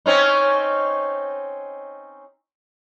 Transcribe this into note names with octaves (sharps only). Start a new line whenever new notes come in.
C4 C#4 D#4